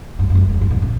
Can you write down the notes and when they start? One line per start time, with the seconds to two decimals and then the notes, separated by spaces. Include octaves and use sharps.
0.19 G2
0.30 G2
0.35 F#2
0.50 E2
0.61 G2
0.70 B2
0.82 C#3